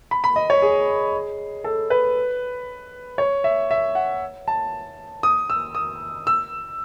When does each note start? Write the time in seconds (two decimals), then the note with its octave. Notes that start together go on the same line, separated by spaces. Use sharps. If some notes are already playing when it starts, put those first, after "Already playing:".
0.11 B5
0.24 B5
0.36 D#5
0.50 C#5
0.62 G#4
1.64 A4
1.90 B4
3.18 C#5
3.44 E5
3.71 E5
3.95 F#5
4.48 A5
5.23 D#6
5.50 E6
5.75 D#6
6.27 E6